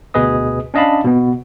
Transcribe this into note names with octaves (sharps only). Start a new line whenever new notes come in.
D2 B2 G#4 B4 D#5 D#6
C#4 D4 D#5 F5 A5 B5
B2 B3